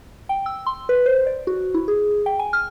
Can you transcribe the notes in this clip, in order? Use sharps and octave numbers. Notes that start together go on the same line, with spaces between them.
G5
E6
C6
B4
C5
D5
F#4
E4
G#4
G5
G#5
F6